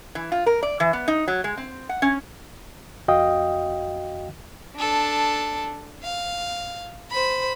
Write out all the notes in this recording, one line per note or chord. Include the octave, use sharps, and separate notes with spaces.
E3
F4
A#4
D5
E3
B3
D#4
F#3
G#3
C4
F#5
C#4
F2 F#4 D#5 F5 G5 D#6
D4 A4
F5
C5 B5